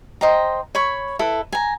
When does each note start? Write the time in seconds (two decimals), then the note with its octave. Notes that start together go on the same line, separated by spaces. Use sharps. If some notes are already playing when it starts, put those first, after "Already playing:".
0.21 C5 D#5 G5 A#5
0.75 C#5 B5 C#6
1.19 E4 A4 B4
1.52 G#5 A#5